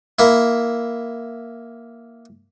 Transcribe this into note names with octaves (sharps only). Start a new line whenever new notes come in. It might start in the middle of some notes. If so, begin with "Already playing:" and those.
A#3 E4